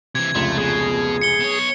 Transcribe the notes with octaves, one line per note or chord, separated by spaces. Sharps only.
C3 E3 G#6
F1 C#2 A3 C6
B2 G#4
C#7 G7
B2 C#5